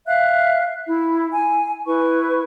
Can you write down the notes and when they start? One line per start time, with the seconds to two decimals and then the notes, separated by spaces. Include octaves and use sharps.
0.06 E5 F5 F#6
0.87 E4
1.29 G#5
1.86 E4 B4 C#6